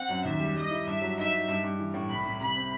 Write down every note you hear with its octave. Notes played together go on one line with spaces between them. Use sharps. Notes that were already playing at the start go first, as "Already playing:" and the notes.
Already playing: C4 F#5
F#2
D#2 E5
G3
G3 D#5
E4
G2 E5
F#3
D#4 E5
D#4
G2
G2
E3
A2
C2 B5
C2
C3 B5
C4